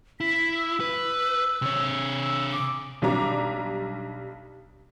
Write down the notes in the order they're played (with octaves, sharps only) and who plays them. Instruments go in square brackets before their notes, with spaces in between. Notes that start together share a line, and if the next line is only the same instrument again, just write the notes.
[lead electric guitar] E4 [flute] B6
[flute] E6
[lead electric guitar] B4
C3 C#5
[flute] E6
D6
[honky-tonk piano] B1 G3 D4 A#5 D6